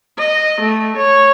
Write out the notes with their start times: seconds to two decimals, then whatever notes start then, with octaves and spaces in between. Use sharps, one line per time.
0.18 D#5
0.60 A3
0.96 C#5